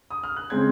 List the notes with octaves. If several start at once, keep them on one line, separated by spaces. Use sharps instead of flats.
D#6
F6
F#6
C#3 G#3 C4 G#6